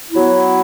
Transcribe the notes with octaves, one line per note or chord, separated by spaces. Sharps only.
F#3 B3 E4